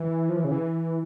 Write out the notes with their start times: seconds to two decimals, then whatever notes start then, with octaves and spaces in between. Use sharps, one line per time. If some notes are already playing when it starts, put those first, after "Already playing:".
Already playing: E3
0.29 F3
0.36 E3
0.44 C#3
0.52 E3